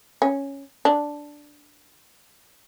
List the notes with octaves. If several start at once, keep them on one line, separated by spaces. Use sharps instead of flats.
C#4
D4